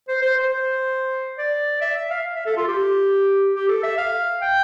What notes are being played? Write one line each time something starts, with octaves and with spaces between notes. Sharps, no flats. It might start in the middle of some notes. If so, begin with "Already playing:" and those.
C5
C5
C5
D5
E5
E5
F5
E5
A4
F4
G4
G4
A4
E5
F5
G5